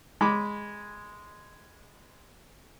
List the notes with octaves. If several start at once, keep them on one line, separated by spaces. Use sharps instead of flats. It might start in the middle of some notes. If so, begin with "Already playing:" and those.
G#3 B5 D6